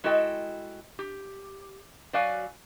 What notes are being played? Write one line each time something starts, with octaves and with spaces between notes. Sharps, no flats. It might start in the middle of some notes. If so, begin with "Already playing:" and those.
G#3 E4 F#4 A4 D#5 G5
G4
F#3 F#4 D5 F5 G#5